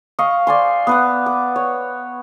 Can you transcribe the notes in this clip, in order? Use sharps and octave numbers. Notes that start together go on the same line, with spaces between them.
D#5 F5 C#6
C5 D5 G#5 C6
B3 B4 F#5
D6
C#5